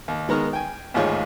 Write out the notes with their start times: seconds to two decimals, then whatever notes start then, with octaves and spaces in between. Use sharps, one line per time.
0.08 D#2
0.29 D#3 G#3 B3 A#5 C#6 F6
0.53 G5 G#5
0.94 A1 D#2 G#2 F4 G#4 C#5